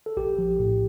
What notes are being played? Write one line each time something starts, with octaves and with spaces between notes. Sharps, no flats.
A4
A#1 G4
F3
A2